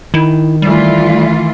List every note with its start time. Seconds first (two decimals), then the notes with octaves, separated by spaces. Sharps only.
0.14 D#3 E4
0.62 E3 G3 A3 F4